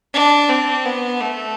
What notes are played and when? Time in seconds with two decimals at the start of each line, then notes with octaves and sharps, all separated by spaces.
0.14 D4
0.49 C4
0.85 B3
1.21 A3